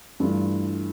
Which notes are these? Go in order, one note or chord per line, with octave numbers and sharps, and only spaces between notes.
G2 E3 A3 D4 F4